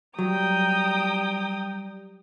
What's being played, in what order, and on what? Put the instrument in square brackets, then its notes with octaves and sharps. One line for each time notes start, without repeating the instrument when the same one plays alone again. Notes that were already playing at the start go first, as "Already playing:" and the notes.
[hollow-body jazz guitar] F#3 [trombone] G3 [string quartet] G5 A#5 D#6